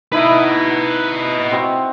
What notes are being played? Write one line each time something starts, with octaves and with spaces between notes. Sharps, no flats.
D#4 E4 B4 D#5
C4 F#4